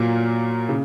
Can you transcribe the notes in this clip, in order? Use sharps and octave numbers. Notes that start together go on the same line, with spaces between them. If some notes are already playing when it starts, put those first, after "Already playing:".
Already playing: A#2 F#3 A#3
C#3